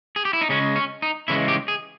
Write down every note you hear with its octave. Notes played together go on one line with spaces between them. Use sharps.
G#4
G4
E4
D#4
C#3 G#3 C#4
C#4
D#4
C#3 E3 G#3 E4
G4
G#4